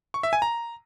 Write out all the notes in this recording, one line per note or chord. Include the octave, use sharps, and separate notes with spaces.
C#6
E5
G#5
A#5